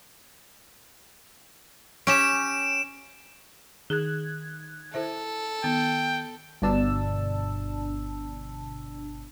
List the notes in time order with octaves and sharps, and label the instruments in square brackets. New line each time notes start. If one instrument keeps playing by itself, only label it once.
[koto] C#4 G4 [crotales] D7 E7
[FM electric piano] D#3 F#6 G#6 [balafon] G#4
[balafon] E4 C5 E5 [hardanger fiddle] A4
[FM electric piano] D#3 [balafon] B3 [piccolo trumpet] G5
[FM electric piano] G1 B2 D4 A5 E6